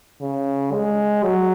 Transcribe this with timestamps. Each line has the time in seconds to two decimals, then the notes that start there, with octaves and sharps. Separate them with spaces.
0.21 C#3
0.72 G#3
1.23 F#3